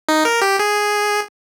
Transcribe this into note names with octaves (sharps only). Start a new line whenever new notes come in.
D#4
A#4
G4
G#4